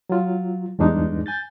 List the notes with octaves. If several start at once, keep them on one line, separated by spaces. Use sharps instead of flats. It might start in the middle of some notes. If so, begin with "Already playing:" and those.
F#3 F4
E2 G2 G#3 D4 D#4
G#5 G6 A6